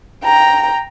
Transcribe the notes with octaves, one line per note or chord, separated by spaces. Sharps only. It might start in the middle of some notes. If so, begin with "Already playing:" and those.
G5 A#5